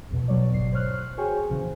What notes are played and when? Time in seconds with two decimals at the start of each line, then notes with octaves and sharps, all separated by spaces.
0.10 A#1 E2 B2
0.28 B2 F#3 C#5 D5
0.52 G1 G#2 C7
0.72 C5 C#5 F6 F#6
1.18 F#4 G#4 C5 C#5 G5 G#5
1.49 A#1 C#3 E3